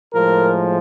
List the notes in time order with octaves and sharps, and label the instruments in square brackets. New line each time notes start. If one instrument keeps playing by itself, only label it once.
[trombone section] A2 F3 G#3 A#4